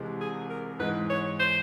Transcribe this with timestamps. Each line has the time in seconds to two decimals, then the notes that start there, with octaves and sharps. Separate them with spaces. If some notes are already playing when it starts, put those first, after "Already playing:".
Already playing: C2 C3 E3 G#3
0.21 G#4
0.50 A#4
0.79 G#2 E3 G#3 B4
1.10 C#5
1.40 C5